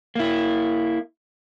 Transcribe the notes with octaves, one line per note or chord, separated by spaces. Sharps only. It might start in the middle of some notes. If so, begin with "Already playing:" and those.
A#3 E4